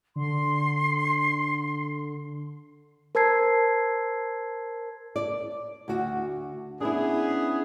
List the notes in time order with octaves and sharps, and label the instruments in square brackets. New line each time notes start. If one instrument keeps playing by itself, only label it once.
[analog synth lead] D3 [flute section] C6
[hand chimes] A#4 C5 A5 E6 G#6 C7
[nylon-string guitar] D5
D2 F#4
[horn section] B3 C#4 G#4 [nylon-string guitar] D4 E4